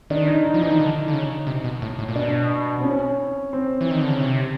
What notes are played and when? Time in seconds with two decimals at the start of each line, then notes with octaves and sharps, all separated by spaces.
0.10 D#3 D4
0.27 D#4
0.45 D#4
0.54 F3
0.61 E3 D#4
0.70 D#3
0.80 D3
1.08 D3
1.13 C#3
1.47 C3
1.64 B2
1.82 A2
1.99 A2
2.08 A#2
2.16 B2 D4
2.80 C4
2.84 C#4
3.53 C4
3.81 E3
3.91 D#3
4.01 D3
4.10 C#3
4.20 C3